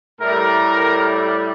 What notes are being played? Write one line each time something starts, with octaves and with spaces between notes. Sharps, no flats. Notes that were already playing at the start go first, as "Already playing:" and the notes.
A2 G3 A#4